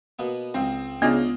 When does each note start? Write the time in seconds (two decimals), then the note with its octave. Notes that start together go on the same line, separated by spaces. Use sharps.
0.19 B2 A#3 B3
0.54 C#2 G#2 C4 F5
1.02 C#3 B3 D4 F4 D#5